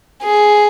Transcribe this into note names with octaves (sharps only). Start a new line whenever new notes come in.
G#4